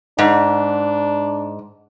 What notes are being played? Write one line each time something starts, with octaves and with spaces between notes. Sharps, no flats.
G#2 D4